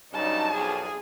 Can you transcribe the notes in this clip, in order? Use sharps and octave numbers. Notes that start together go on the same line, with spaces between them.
G2 C#3 F#3 D#4 A5
B1 F2 G#4